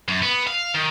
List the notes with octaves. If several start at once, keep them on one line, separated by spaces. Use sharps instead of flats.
F#2
B3
F5
D#3